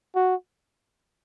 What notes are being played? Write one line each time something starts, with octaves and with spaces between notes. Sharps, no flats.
F#4